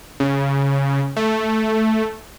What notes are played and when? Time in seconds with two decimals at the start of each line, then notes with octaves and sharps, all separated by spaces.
0.20 C#3
1.16 A3